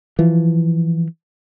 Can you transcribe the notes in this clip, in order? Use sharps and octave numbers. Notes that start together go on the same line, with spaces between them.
E3 F3